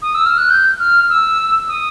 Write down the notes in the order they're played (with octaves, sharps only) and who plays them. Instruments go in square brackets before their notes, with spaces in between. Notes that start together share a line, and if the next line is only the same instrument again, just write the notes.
[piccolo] D#6
E6
F6
F#6
G6
F6
E6
D#6